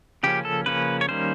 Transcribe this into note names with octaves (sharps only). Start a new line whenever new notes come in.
C#3 F3 A#3 C#4 G4
A4
C#3 F3 A#3 C#4 B4
C#5
D#3 G3 A#3 C#4 C5